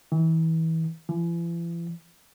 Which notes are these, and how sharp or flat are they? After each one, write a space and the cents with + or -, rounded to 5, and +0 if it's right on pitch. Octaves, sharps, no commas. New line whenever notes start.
E3 -30
E3 +45